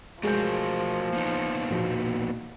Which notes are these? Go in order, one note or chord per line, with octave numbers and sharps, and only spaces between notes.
F3 G#3 A3 F#4 A#4 G6
A#3 B3 D#4
A#1 B2